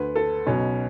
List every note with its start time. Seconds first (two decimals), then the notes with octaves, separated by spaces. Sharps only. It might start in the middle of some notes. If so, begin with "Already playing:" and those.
Already playing: D2 D3 B4
0.16 A4
0.46 B1 B2 C#4